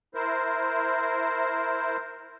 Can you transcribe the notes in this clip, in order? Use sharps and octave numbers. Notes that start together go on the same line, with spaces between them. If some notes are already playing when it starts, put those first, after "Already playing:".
E4 A#4 C5